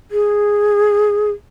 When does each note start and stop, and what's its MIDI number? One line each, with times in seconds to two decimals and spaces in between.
0.11 1.30 68